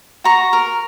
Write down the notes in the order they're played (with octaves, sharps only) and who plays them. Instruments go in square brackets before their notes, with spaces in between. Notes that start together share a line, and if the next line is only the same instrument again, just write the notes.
[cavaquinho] F#4 A#5 C#6
A#4